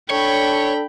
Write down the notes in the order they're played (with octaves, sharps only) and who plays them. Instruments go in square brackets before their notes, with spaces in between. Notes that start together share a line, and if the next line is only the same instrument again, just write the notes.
[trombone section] D4 A4 [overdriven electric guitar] C#5 [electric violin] G5 B5